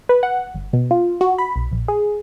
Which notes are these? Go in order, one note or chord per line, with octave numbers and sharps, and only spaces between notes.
B4
F#5
G1
B2
F4
F#4
B5
B1
A#1
G#4